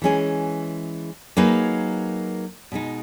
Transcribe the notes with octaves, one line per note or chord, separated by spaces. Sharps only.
E3 G#3 C#4 G#4
F#3 A#3 D#4 G#4 B4
B2 G#3 D#4